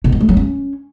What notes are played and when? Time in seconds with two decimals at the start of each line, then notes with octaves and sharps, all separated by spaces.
0.04 B2
0.12 F#3
0.21 A3
0.29 F#3
0.37 C#4